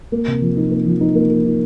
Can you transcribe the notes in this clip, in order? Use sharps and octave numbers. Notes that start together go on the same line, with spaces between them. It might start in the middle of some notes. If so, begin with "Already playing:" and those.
A#3
C3
F3
D#4
A#3
F3
D#4
A#3
A#3
D#4